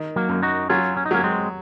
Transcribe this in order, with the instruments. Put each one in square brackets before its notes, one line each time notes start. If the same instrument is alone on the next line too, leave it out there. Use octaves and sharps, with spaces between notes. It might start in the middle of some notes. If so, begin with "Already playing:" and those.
Already playing: [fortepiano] D#3
[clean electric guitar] F#3 A#3
[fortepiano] F#2
[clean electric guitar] D#4 F#4
[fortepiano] F#3 [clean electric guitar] C#4 F4
[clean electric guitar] C#4
D#4
[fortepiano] F#3 [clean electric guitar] A#3 C#4
[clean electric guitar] G#3 C4